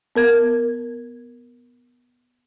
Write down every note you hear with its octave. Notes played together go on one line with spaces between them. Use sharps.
B3 A#4 G#6